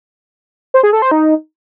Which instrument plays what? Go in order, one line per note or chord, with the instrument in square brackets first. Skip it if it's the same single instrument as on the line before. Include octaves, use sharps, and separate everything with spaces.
[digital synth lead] C5
G#4
A4
C5
D#4